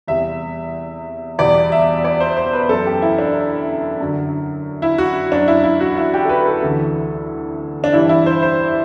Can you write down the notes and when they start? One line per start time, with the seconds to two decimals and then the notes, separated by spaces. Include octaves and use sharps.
0.08 E2 C3 G3 E5
1.39 E2 B2 G3 D5
1.72 E5
2.05 D5
2.20 C5
2.37 C5
2.53 B4
2.69 F#2 F#3 A4
2.86 G4
3.02 E4
3.18 D4
4.00 F#2 D3 F#3
4.82 E4
4.98 F#4
5.32 F#2 F#3 D4
5.48 E4
5.64 E4
5.80 F#4
5.98 E4
6.14 G4
6.25 A4
6.29 B4
6.46 A4
6.63 D2 C3 E3
7.84 D4
7.93 G2 E3 G3 E4
8.09 E4
8.26 C5
8.43 C5